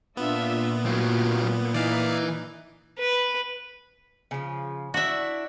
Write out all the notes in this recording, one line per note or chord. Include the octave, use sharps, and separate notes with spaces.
A#2 B3 D4 F4 E5
A2 F#3 F4
E3 D#4 E4 D5 F5
B4
C#3 F3
D4 E4 F#4 E5